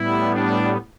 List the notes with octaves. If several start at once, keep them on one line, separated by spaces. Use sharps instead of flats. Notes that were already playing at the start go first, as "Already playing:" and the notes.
Already playing: A2 G3 B3 E4
D4